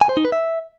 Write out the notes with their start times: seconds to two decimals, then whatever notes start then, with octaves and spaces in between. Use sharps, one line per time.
0.01 G#5
0.09 C5
0.17 D#4
0.25 B4
0.32 E5